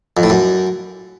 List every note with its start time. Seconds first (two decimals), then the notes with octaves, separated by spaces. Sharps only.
0.17 F2
0.23 A2
0.30 F#2